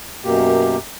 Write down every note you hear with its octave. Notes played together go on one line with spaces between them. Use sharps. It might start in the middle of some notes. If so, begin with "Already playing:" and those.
F#2 B2 A#3 G4